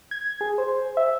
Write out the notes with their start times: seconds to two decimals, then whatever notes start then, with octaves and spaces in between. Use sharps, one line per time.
0.11 G#6
0.41 G#4
0.58 C5
0.97 E5